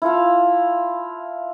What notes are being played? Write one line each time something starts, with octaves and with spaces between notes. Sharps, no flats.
E4 F4 A4 F5